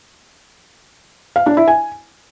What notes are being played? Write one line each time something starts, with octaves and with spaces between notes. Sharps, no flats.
F5
D4
E4
G#5